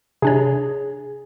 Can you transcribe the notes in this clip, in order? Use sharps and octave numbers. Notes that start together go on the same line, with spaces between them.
C3 D4 G#4 C#5